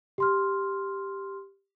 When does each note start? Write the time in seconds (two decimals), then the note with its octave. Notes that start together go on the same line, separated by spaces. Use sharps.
0.18 G4 C6 F6